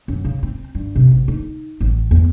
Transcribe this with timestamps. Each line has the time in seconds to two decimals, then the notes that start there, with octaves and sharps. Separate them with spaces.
0.08 F#2
0.25 C#3
0.43 C4
0.75 G2
0.95 C3
1.11 A1
1.28 D#4
1.81 A1
2.11 E2